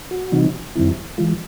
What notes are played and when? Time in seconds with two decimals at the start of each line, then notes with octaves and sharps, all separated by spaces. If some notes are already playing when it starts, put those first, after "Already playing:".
0.11 F#4
0.32 C3 E3 G3 C4 D#4
0.75 F#2 D#3 G3 C4 E4
1.18 E3 G#3 F4